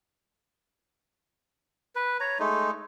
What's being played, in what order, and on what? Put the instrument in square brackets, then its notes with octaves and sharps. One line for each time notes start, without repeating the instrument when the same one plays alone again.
[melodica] B4
C#5 A#5
G#3 A3 D#4